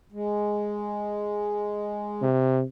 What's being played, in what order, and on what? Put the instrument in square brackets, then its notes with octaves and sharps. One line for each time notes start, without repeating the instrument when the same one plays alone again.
[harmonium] G#3
[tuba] C3